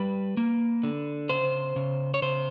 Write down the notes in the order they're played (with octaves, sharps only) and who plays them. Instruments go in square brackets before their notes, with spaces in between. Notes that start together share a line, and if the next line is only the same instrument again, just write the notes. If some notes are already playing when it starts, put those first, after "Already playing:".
Already playing: [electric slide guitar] G3 B4
A#3
D3
C#3 C5
C#3
C#5
C#3 C5